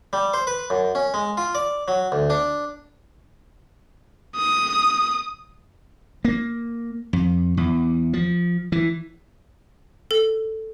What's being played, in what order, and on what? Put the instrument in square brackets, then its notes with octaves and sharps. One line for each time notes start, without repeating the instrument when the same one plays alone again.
[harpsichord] G3
C5
B4
F#2
C#4
G#3
F4
D5
F#3
D2
D4
[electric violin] D#6
[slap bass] A#3
F2
E2
F3
E3
[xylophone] A4